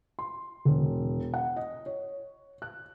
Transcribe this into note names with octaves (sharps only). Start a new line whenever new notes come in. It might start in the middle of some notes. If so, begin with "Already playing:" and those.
C6
E1
F#5
D#5
C#5
F#6